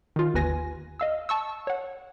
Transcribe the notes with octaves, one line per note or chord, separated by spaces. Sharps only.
D#3 F4
G1 D#2 B4 G#5 A#6
D#5 F5 E6
A5 C#6 E6
C#5 F#5